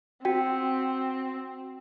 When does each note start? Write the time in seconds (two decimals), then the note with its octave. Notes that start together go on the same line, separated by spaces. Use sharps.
0.25 C4 F#4 G5